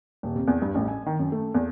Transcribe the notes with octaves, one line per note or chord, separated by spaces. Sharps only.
D#1
C3
E2
G2
A1
G#5
D#3
F#2
A3
E2